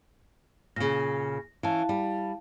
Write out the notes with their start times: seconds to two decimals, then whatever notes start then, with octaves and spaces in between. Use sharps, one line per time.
0.76 A#2 C#3 A#6
1.63 E3 C#4 E4 F5 A5
1.89 G3